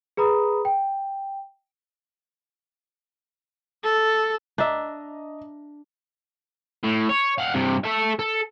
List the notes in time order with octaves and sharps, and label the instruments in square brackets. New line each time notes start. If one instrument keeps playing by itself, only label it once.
[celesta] G#4 B4 A#5 B5 D#6
G5
[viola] A4
[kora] D4 E5 [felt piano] D#5 A#5
[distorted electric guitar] A2
C#5
F5 F#5
G2 C3
A4 E5
A4